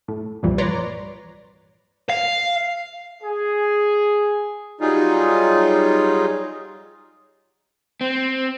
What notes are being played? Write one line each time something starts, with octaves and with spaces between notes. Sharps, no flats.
A2
C2 G2 A#2 E3 F3 G3
B4 C#5 D5 A#5 C6
F5
G#4
F#3 G3 D#4 F4 G#4
C4